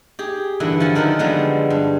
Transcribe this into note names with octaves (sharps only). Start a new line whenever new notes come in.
G4 G#4
G2 D3 E3 E4
F3 F#5 G#5 A5
F#2 D#3 F3 E5 F#5
D3 F3 G3 G#3 B3
G2